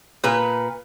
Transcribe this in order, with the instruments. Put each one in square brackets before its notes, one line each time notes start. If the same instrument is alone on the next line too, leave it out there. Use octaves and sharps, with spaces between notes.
[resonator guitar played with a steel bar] A#2 B4